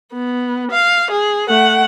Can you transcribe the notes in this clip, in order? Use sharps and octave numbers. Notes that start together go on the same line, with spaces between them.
B3
F5
G#4
A3 F#5